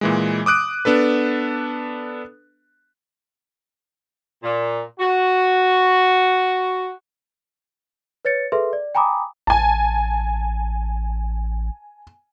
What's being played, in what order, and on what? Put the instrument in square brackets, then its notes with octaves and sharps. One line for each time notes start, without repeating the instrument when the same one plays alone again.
[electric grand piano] A#2 E3 G#3
D6 D#6 F#6 D7
B3 D4 A4 B4
[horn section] A#2
F#4
[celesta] B4 C#5 A6 C#7
G#4 A4 B4 E5 C6
D5
G5 G#5 A#5 B5 D6 D#6
[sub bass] A1 [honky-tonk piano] G#5 A5